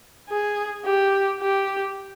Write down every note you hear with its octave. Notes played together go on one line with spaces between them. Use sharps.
G#4
G4
G4